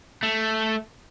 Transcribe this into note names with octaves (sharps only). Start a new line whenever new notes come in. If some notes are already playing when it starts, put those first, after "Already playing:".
A3